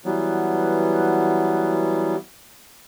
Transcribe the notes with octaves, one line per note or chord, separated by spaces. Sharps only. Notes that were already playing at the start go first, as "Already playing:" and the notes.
E3 F#3 G3 B3